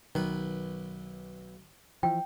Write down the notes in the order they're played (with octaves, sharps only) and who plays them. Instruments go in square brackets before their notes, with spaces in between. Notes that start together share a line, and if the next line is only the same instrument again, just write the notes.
[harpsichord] B1 B4 [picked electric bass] D#3
[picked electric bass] E3 F3 [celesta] G5